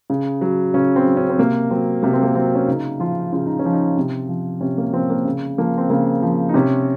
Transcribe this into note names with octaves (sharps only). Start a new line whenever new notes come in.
C#3
F#3
C#3 C#4
C4
F#3
C#4
C4
C3 A#3
F#3 C4
C3 A#3
C4
A#3
F#3 C4
C#4
C#3 D#4
F3 F4
C#3 F4
D#4
C#4
F3
D#4
C3
F3
C3 C#4
A#3
F3 C4
A#3
C#3
F3 A#3
C4
C#3 A#3
F3
D#4
C3 C#4